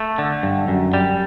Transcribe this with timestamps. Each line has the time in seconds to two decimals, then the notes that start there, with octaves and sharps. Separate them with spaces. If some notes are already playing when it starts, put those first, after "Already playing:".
Already playing: A3
0.18 D3
0.43 G2
0.68 F#2
0.94 G3